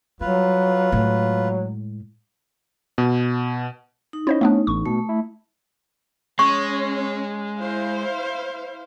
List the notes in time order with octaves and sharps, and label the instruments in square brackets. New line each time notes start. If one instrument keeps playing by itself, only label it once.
[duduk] F#3 [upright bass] G3 [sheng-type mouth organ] F4 B4
[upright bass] A2 G#3 [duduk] F#3
[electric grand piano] B2
[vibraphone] D#4
[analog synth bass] C#4 [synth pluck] E4 C5 D#5
[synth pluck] A3 B3 D4
[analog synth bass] A1 [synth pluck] C#6
[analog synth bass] B2 [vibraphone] A3
[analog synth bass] E4
[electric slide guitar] G#3 [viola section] C#4 [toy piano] C#6
[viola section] E4 C5 F5